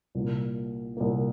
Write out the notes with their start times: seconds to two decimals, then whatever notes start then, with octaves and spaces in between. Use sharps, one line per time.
0.15 C2 A#2 A#3
0.97 C2 A#2 A#3